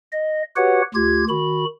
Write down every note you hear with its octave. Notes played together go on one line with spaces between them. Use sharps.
D#5
F#4 G4 B4 C#5 F#5
D2 F4 G4 G#6
D#3 F#4 B5